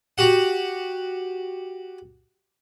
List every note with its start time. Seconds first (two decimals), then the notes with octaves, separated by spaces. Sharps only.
0.18 F#4 G4 F#5